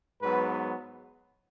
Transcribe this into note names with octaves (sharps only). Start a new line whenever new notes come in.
G#2 F#3 B3 B4